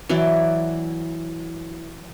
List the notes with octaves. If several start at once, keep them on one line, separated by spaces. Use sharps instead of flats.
E3 F#3 E4 D5